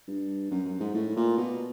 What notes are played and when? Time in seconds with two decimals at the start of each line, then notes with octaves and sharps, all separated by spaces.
0.08 G2
0.51 F#2
0.65 F#2
0.80 G#2
0.94 A2
1.17 A#2
1.38 B2